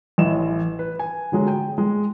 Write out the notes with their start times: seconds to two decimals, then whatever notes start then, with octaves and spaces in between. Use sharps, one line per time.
0.18 A1 A2 D#5 E7
0.79 B4
0.99 G#5
1.32 D3 F#3 G#3
1.48 G5
1.78 G#3